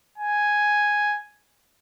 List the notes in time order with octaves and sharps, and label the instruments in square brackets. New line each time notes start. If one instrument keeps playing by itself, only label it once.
[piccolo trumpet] G#5